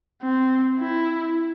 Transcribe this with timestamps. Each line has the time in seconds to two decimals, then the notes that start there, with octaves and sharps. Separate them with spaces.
0.22 C4
0.79 E4